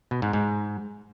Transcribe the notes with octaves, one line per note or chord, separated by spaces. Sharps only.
B2
G#2
G#2